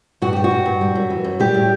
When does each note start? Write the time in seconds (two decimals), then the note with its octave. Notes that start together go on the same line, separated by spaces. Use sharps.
0.22 G2 F#4
0.33 G3 G4
0.44 F#4
0.51 G2
0.66 G2
0.81 G3
0.95 F#2
1.10 E3
1.25 F#2
1.40 G3 G4
1.54 A2